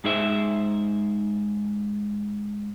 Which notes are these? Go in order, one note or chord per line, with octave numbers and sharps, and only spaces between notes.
G#2 D#4 G#4 C5 E5